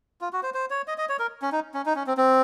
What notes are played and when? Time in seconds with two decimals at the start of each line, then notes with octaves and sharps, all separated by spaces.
0.21 F4
0.33 F#4
0.43 C5
0.54 C5
0.70 C#5
0.88 D#5
0.98 D#5
1.09 C#5
1.19 A#4
1.42 C#4
1.52 D#4
1.74 C#4
1.86 D#4
1.96 C#4
2.07 C4
2.17 C4